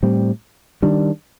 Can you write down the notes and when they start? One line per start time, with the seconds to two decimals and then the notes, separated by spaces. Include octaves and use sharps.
0.03 A2 G3 C4
0.82 D#3 G3 D4